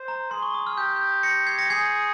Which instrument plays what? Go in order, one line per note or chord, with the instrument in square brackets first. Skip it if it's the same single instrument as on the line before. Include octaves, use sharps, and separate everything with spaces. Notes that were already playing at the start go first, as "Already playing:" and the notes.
Already playing: [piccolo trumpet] C5
[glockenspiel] A#5
[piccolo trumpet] G#4 [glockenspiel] C6
[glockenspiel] C#6
D#6
F6
[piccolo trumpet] G4 [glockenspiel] G6
[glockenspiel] F6
G6
A#6 C#7
G#6 C7
A#6 C#7
[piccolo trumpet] G#4 [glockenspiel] G#6 C7